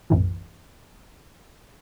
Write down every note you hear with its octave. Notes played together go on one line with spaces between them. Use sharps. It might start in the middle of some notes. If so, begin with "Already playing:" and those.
B1 F#2 A2 E3